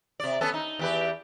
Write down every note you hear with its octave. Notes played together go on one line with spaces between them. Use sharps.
C3 D5
B3 C#4 A4
D#4
E2 G4 B4